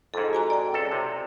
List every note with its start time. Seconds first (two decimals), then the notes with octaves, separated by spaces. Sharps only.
0.14 F2 G#2 G#4 A4
0.33 F#4 G#5 A#5
0.50 D5 G5
0.74 C#2 A4
0.92 C3